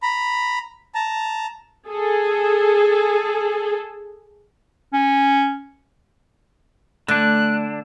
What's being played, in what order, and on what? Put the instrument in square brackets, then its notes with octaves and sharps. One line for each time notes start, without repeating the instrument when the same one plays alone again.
[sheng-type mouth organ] A#5 B5
A5 A#5
[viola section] G#4 A4
[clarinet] C#4
[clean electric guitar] D3 D4 [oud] A3 [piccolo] F#6